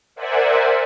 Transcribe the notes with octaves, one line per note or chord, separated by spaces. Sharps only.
A#4 C5 D5 E5 F#5 G#5